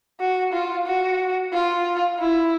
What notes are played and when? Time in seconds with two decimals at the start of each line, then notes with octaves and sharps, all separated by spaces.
0.20 F#4
0.52 F4
0.86 F#4
1.53 F4
2.19 E4